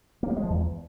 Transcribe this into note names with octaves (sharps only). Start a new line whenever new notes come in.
A#3
G3
G#3
F3
E2